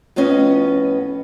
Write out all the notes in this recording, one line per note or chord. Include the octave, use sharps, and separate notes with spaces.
F2 A2 B3 C#4 D#5